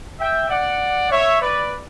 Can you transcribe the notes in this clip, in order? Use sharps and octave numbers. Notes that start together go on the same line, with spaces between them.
E5 G5
D5 F#5
C#5 E5
B4 D5